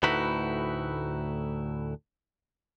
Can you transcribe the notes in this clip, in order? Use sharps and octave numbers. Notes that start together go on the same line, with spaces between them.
D2 A2 D#4 E4 F#4 B4